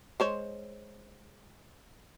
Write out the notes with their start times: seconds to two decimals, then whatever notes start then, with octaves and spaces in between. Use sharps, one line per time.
0.20 G#3 C5 C#5